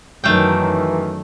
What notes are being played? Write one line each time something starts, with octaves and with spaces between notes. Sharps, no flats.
F#2 D#3 E3 F#3 A3 F5 G5